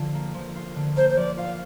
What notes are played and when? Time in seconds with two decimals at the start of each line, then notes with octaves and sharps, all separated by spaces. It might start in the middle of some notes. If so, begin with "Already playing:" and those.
Already playing: D3 F3 F4
0.14 A#3
0.35 F3
0.56 F4
0.76 D3
0.96 A#3 C5
1.09 C5
1.17 F3 D5
1.37 F4 F5